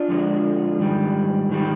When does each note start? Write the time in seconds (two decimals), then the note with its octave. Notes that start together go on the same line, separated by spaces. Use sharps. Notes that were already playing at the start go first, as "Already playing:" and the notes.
Already playing: D4 F4
0.09 F2 D3 F3 G#3
0.79 G#2 D#3 G3
1.49 G#2 D#3 G3